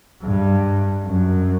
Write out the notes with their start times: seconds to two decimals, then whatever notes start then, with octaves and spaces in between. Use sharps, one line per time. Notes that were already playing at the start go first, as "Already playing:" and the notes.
0.23 G2
1.06 F#2